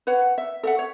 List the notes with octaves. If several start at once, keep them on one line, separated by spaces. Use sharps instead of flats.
B4 C#5 F#5
E5
A4 E5 F#5
C#5